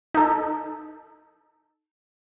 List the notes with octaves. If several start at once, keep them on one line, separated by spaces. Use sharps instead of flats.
D#4 A4